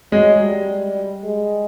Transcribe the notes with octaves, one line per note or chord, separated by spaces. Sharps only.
F#3 G#3
G3
G#3